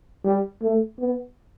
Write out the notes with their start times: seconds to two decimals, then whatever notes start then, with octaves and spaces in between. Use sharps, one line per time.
0.25 G3
0.62 A3
1.00 B3